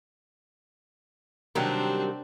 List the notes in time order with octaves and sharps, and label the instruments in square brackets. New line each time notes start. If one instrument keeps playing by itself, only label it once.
[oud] C3 D#3 G3 [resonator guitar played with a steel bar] F#3 G4 A#4 [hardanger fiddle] C4 D4